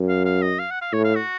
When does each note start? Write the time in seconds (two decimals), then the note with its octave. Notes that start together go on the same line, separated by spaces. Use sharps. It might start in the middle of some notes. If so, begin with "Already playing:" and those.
Already playing: F#2
0.09 F5
0.25 F5
0.42 D#5
0.59 F5
0.70 F#5
0.81 F5
0.93 A2 C#5
1.04 F5
1.15 F#4